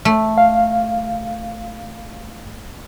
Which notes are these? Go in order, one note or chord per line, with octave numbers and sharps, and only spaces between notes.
A3
F5